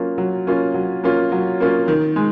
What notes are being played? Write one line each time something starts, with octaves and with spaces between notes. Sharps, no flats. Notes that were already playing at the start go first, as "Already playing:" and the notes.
Already playing: F#3 A#3 C#4 F4
F#3
A#3 C#4 F4
F#3
A#3 C#4 F4
F#3
A#3 C#4 F4
D#3
G#3